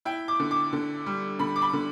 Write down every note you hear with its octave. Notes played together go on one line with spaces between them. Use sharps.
E4 G5
D6
D3
D6
D3
G3
D3 B5
D6
B5
D3